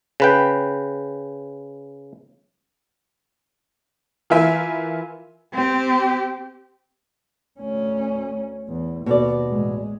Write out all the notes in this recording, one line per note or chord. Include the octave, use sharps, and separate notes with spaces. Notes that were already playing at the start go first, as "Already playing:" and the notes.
C#3 B4 G5
E3 F4 A#4 E5 G#5
C4 G4
D2 C#4
E2
D#2 B2 D5
A1 G#3